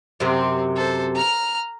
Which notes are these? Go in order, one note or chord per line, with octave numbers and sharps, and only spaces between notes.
F#2 C3 C4
A4 C5
A#5 F6